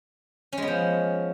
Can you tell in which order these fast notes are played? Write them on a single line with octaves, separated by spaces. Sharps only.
C#4 G#3 B3 F3